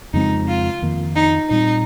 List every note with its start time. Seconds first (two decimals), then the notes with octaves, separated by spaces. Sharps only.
0.14 F2 C#3 G#3 C4 D#4
0.48 F4
0.82 F2 D#3 A#3
1.16 D#4
1.50 A#2 G3 C4 D#4